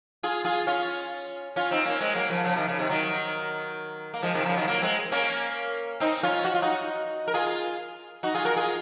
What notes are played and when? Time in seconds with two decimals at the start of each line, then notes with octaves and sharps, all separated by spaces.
0.23 F4 G#4
0.45 F4 G#4
0.67 C#4 F4
1.56 C#4 F4
1.71 C4 D#4
1.85 A#3 C#4
2.01 G#3 C4
2.15 F#3 A#3
2.30 C#3 F3
2.44 C#3 F3
2.56 C3 D#3
2.68 C#3
2.79 C3 D#3
2.90 D#3 F#3
4.14 A#3
4.23 F3 G#3
4.34 C3 D#3
4.45 C#3 F3
4.57 D#3 F#3
4.68 F#3 A#3
4.82 G#3 C4
5.12 A#3 C#4
6.00 C4 D#4
6.23 C#4 F4
6.45 F#4
6.54 F4
6.62 D#4 F#4
7.28 A#4
7.34 F4 G#4
8.23 D#4 F#4
8.35 F4 G#4
8.45 F#4 A#4
8.56 F4 G#4